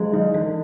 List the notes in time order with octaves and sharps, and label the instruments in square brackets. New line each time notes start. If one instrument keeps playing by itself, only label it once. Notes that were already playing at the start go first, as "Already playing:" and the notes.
Already playing: [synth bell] F#3 C#4 E4 [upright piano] G#3
[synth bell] D#3 [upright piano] D#4
[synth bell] E3